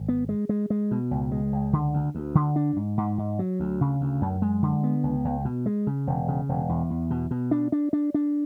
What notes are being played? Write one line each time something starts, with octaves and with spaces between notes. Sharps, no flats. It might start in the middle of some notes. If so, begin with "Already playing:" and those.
Already playing: G#1
B3
G#3
G#3
G#3
B2
C#2
G#3
C#2
D3
D2
D2
D3
D4
G#2
G#2
G#2
F#3
D2
C#3
D2
F#2
G#3
D3
B3
C#2
C#2
B2
G#3
C#3
E1
C#3
E1
E2
E2
B2
B2
D4
D4
D4
D4